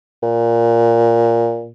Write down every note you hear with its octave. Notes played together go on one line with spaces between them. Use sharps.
A#2